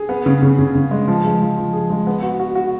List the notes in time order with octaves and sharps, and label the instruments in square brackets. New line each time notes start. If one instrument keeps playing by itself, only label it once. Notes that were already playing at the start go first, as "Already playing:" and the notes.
Already playing: [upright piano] G#4
B3
C#3
C#3
C#3
C#3
G#3
F3
G#3
F3
F3
G#4
G#3
B3
F#4
F#4
F#4